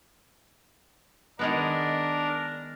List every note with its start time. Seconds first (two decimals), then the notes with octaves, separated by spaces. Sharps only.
1.39 D#3 G#3 B3 D4 A#4